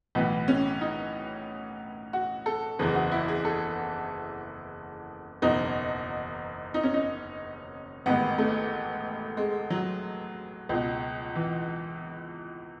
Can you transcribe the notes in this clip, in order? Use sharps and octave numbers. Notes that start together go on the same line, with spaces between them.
B1 A2 E3 B3
C#4
D#4
F#4
A4
F#1 E2 C#3 E3 G#4
F#4
E4
G#4
A4
F#1 E2 B2 D#4
D#4
C#4
D#4
A1 G#2 D#3 B3
A3
G#3
F#3
C#2 B2
E3